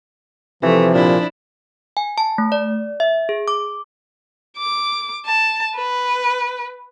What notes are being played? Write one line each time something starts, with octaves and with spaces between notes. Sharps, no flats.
C3 E3 F3 A3
A#2 D4 E4
G#5
A5
A3
D5
E5
G#4
D6
D6
A5
B4